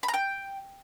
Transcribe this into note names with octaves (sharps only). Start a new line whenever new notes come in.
B5
A#5
G5